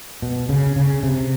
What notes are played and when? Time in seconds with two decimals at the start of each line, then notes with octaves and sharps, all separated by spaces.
0.22 B2
0.49 C#3
0.76 C#3
1.03 C3